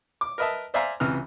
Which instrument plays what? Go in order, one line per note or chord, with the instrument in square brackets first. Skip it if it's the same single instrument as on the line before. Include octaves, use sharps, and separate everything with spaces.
[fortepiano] D6
A#4 B4 D#5 E5 A5
C5 D5 E5 F5 G#5 A#5
C#2 C3 E3 F6